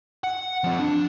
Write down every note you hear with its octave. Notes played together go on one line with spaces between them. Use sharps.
F#5
F3 C4
D4